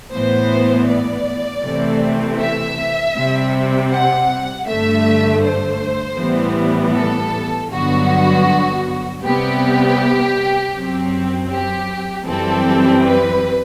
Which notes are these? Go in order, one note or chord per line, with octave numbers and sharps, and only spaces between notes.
A2 E3 B3 C5
D5
C3 E3 A3 C4
E5
C3 G3 C4
F#5
G2 D3 A3 E5
C5
A2 E3 G3 B3
A4
G2 D3 F#3 B3 F#4
C3 G3 B3 G4
F#2 F#3 C4
G4
F#2 E3 G3 C4 A4
B4